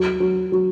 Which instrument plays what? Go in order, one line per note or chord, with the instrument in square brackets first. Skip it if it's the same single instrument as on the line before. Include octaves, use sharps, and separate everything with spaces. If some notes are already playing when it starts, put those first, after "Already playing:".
Already playing: [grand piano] F#3
F#3
F#3